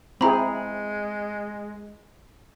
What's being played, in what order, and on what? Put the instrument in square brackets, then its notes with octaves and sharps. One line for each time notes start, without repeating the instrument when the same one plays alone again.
[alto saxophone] G#3 [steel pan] C4 E4 G#4 [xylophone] A#5 B5